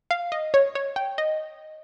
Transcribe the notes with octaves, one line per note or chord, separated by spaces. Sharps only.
F5
D#5
C#5
C#5
G5
D#5